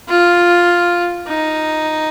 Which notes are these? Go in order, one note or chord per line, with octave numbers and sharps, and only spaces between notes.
F4
D#4